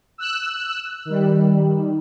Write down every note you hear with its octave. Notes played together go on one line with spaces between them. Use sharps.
E6 F#6
D#3 G3